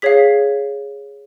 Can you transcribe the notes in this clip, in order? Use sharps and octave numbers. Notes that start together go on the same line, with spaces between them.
G#4 C#5 F5 B6